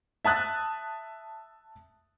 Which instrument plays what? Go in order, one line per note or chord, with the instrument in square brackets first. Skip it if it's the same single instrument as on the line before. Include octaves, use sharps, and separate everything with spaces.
[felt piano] E5 A5 D#6 F#6 A6